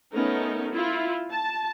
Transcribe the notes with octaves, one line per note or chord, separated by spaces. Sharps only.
A3 B3 C#4 D#4 A#4
E4 F4
A5